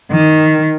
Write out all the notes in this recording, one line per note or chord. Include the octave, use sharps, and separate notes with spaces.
D#3